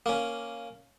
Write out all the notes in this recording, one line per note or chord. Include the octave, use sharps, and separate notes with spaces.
A#3 C#4